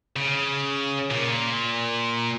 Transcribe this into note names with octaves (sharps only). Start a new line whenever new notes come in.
C#3
A#2